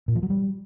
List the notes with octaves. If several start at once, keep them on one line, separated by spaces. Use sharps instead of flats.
A#2
F3
F#3
G3